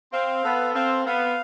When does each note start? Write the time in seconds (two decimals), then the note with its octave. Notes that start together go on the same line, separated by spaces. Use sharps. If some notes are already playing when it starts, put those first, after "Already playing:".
0.13 C4 F5
0.44 B3 A4
0.75 C4 F5
1.06 B3 F5